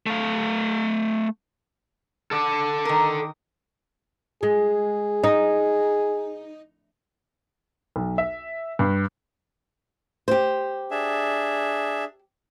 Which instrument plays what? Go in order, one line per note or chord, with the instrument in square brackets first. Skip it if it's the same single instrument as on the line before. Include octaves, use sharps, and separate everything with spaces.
[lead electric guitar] A3 F5
[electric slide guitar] A4 D5
[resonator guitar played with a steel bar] D#3 A#4
[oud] G#3 [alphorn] G#4
[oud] D#4
[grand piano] B1
E5
G2
[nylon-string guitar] G4 C5
[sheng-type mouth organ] D4 G#4 E5